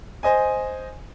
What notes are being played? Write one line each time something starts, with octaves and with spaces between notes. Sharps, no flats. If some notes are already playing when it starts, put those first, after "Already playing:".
C5 D#5 G#5